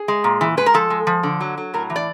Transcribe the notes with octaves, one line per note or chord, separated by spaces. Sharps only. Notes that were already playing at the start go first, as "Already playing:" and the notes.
Already playing: G#4
G#3
A#2
E3
G#3 B4
A#4
F3 A4
G#3
F3
D3
F#3
F#3
A2 A#4
E3
D5